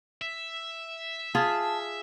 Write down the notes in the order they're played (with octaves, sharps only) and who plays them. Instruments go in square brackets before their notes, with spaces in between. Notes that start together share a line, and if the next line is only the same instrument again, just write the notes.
[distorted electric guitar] E5
[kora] F4 G#4 [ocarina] A5